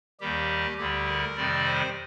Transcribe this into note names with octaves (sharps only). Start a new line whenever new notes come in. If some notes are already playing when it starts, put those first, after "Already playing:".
D#2 D#3 G3 G4
D2 D3 G3 G4
A#4
F2 C3 D#3 G3 D5
C5